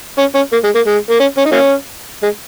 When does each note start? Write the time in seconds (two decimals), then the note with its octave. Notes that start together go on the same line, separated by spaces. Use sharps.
0.18 C#4
0.35 C#4
0.52 A#3
0.64 G#3
0.75 A#3
0.86 G#3
1.10 A#3
1.20 C#4
1.37 C#4
1.45 D#4
1.52 F#3 A#3 C#4
2.23 G#3